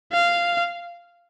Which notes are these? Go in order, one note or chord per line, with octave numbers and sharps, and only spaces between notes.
F5